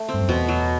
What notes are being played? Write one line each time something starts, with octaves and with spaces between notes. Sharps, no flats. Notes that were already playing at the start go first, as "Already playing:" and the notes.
Already playing: A3
C4
G2
F#2
E2 B2
F#3